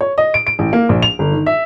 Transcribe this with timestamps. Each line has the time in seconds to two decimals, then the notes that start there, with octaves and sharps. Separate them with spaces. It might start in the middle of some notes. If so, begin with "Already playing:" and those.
0.01 C#5
0.18 D#5
0.34 D7
0.47 D7
0.59 A1
0.73 A#3
0.89 A#1
1.02 F7
1.19 G1
1.32 D#3
1.46 E5